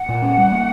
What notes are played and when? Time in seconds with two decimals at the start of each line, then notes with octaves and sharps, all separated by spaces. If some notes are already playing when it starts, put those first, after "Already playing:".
Already playing: F#5
0.09 A#2
0.22 C#4
0.38 G3
0.52 A#3